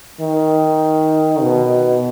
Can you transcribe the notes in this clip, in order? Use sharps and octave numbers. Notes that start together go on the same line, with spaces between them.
D#3
B2